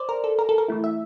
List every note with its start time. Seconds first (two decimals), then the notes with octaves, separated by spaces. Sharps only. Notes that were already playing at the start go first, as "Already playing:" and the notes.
Already playing: C5 D5
0.09 A#4
0.24 A4
0.39 A#4
0.49 A4
0.58 A#4
0.68 E3 A3 E4
0.84 E5